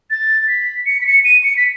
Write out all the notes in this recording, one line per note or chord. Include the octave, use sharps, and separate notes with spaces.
A6
B6
C#7
B6
C#7
D#7
C#7
B6